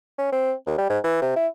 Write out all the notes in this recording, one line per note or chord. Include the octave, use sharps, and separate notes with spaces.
C#4
C4
D#2
G3
G#2
E3
C3
E4